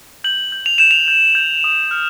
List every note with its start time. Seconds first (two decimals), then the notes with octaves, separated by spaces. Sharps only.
0.24 G6 F#7
0.52 G6
0.66 F7
0.78 G6 E7
0.91 F7
1.08 G6
1.35 G6
1.64 D#6
1.91 F6